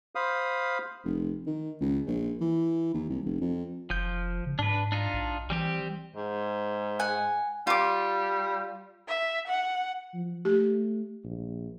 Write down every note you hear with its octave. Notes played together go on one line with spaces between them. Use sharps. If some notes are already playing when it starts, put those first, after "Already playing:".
C5 F5 B5 D#6
F1
D#3
C#2
A#1
E3
D#2
C2
F1
F2
F1 F3 G6
C#3
G#2 D4 B4
D4 D#4 F4
A#1
E3 G3 C4 G4
G#2
F#5 G#5
G3 F4 D6
E5
F#5
F3
A3 G4
A#1